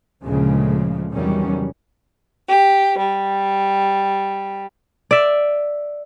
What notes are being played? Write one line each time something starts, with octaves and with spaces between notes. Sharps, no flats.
D2 A#2 C#3 F3 G#3
E2 C3 D#3 F#3 G3 C#4
G4
G3
D5 E5